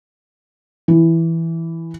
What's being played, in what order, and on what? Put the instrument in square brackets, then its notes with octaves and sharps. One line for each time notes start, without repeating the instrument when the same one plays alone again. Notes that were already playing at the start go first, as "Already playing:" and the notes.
[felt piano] E3